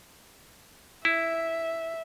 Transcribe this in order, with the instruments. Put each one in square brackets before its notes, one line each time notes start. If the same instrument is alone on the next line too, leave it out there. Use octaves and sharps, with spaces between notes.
[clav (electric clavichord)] E4 [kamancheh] E5